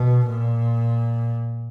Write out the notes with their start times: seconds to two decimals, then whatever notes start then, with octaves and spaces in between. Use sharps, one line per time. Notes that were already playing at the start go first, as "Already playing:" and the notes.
Already playing: B2
0.27 A#2